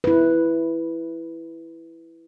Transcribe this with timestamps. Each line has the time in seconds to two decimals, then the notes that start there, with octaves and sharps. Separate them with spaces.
0.04 E4 B4